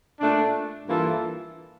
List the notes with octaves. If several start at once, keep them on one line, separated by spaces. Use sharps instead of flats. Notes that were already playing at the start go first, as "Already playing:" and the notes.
A#2 A3 D4
G2 E3 A#3 F4 A4